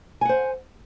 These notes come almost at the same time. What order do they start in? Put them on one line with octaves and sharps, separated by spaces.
G#5 F#5 C5